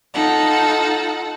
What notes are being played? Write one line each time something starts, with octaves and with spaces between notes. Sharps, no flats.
D#4 F4 A4 F#5